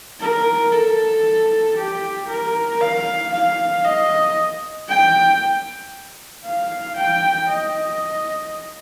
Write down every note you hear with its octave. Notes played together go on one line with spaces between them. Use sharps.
A#4
A4
G4
A#4
F5
F5
D#5
G5
F5
G5
D#5